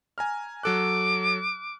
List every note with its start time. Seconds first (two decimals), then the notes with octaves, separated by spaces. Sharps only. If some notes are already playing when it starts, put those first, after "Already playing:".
0.18 G#5 A#5 F6
0.63 F#3 A4 D6 F#6